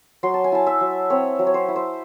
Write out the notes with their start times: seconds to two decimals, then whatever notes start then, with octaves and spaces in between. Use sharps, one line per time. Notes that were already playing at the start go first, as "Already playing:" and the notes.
0.23 F#3 C6
0.34 A5
0.44 G#5
0.52 E4 A5
0.66 E5
0.81 F#3
1.10 C4 C#5
1.39 F#3
1.47 C#5
1.54 C5
1.68 E4
1.76 C5